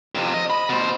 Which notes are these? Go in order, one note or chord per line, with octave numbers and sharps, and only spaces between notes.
F2 C3
D#5
B5
B2 C5